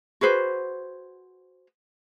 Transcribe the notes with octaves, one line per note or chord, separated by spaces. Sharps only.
F#4 G#4 B4 C5